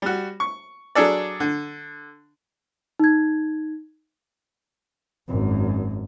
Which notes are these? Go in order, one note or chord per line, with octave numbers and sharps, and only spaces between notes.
G3 F#4
C#6
F#3 D4 G#4 A4 D5
D3
D#4 G#6
G#1 F#2